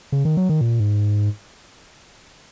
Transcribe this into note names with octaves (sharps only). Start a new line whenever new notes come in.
C#3
D#3
F#3
D#3
A#2
G#2